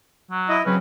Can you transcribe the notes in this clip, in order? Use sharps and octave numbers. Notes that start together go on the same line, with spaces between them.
F#3
E4 D#5
C#3 F#3 C4 C#4 B4